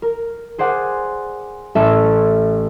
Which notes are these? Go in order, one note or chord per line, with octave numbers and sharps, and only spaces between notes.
A#4
G#4 C5 D5 F#5 G#5
A1 A3 C#4 A4 E5 F6